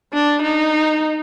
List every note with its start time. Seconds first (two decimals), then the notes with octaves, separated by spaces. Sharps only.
0.13 D4
0.42 D#4